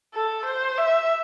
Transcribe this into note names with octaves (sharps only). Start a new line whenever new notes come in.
A4
C5
E5